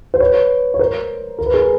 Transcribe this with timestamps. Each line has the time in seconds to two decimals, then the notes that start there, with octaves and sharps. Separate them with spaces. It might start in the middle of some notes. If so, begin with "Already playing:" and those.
0.14 C5
0.20 B4 C#5
0.74 C#5
0.79 A#4 C5
1.39 A#4
1.46 B4
1.54 G#4 A#4